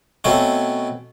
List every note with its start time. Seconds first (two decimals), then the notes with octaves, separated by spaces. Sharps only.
0.24 B2 A3 C4 C#4